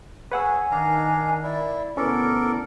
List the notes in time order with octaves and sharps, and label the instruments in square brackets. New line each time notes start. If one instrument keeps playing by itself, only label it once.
[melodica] G#4 C#5 [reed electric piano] B4 F#5 E6 [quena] G#5
[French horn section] D#3 [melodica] D4 F5 A#5
[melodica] E4 [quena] D5
[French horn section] D2 B2 B3 [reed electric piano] C#4 [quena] E4 [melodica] A4 A#4 D5